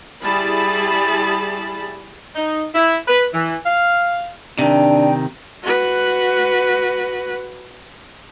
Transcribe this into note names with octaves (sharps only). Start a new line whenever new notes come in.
G3 E4 G#4 A5 B5
D#4
E4
B4
E3
F5
C3 D#3 D4 G5
F#4 B4